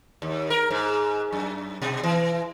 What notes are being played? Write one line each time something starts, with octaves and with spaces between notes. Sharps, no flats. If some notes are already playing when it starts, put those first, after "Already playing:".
D#2
A#4
G#2
F#2
B2
E3